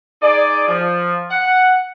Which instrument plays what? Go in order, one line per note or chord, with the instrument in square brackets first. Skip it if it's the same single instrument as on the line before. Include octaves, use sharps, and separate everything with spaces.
[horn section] D#4 G#4 D5
F3
F#5